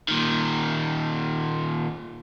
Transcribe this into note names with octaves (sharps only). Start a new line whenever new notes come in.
A#2 D#3